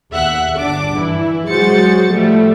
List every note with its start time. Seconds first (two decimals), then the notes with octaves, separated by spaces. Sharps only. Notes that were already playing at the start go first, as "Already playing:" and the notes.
0.13 D#2 E5 F#5 F#6
0.57 G1 D4 D6
0.97 E3 E4
1.49 F#3 G#3 F#4 C5 A6 C#7
2.13 A2 F3 G3 A3